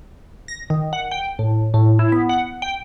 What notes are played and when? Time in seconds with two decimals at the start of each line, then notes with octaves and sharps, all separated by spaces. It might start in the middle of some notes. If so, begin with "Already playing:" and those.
0.48 A#6
0.70 D#3
0.93 F#5
1.11 G5
1.39 A2
1.74 A2
1.99 E4
2.12 B3
2.29 F#5
2.62 G5